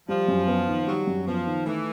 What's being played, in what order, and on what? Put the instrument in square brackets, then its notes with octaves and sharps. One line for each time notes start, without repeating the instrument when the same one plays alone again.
[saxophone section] F3 [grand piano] G3
[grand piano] F#2
B3
D#3
[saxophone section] F#3 [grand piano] G3
[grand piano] F#2
[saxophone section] F3 [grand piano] B3
[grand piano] D#3
[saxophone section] E3 [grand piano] A3